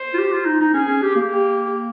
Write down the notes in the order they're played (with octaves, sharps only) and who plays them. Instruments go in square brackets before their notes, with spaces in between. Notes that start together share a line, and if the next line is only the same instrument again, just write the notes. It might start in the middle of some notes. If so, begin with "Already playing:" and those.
Already playing: [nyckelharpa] C5
[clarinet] F4
G4
F4
D#4
D#4
[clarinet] C#4 [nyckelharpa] G#4
[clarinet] C#4
G4
A#3
[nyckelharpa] G4